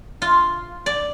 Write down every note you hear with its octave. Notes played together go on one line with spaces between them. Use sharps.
F4
D5